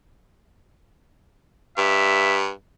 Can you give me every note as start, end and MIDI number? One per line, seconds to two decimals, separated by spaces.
1.78 2.50 43
1.78 2.38 76